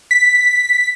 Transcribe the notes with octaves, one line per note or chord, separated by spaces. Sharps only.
B6